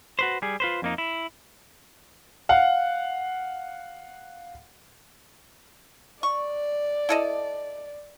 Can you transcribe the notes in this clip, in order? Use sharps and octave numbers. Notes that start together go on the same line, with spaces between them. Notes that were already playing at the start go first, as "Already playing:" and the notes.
F#4 B4 C5
G3 G#4
F4 B4 C5
F2 A#3 D#4
E4
F5 F#5
D5 C#6
E4 A4 D#5